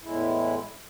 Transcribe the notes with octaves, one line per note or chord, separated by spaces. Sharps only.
E2 A2 G#3 E4